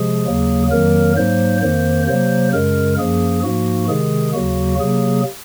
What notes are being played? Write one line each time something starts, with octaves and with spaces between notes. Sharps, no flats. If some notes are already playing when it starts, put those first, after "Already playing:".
Already playing: C3 F3 G#3 G#4
D#2 C#3 F#3 A#3
F2 D#3 F#3 A#3 A#4
G#2 F#3 A#3 C5
F2 D#3 A#3 C5
C3 F#3 A#3 C5
F#2 C#3 G#3 A#4
F#2 F3 A#3 G#4
G#2 F3 A#3 F#4
C3 D#3 G#3 G#4
D#2 C#3 F#3 A#3 F#4
C3 F#3 A#3 G#4